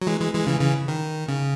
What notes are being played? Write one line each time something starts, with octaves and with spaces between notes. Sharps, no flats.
F#3
E3 G#3
E3 G#3
E3 G#3
C#3 E3
C#3 E3
D#3
C#3